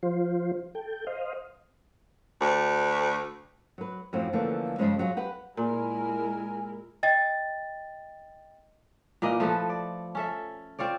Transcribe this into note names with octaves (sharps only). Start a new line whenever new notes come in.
F3 F4 C5
A4 G5
C5 D#5 F5
D2
F#3 B4
F#2 A2 F3 F#3 C4
D3 E3 F3 A3 A#3 C#4
G2 A#2 C#3 F3 G#3 C#4
F#3 F4 G#4
G4 B4 F#5
A#2 G#3 E4 A#4 G#5
D#5 G5 A6
A#2 E3 A#3 D#5
F3 A3 A4 B4
D5
C#4 A4 E5
C4 F4 C#5 D5